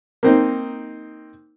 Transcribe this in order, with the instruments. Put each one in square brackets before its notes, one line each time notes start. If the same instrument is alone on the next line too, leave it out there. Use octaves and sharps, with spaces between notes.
[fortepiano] A#3 C4 D#4